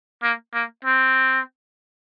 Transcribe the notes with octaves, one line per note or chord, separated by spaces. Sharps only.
A#3
A#3
C4